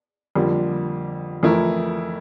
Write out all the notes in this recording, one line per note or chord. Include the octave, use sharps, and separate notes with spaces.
F2 D3 G3 A#3
F2 E3 A3 E4 A#4